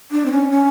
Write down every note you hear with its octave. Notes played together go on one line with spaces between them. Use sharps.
D4
C4
C#4
C#4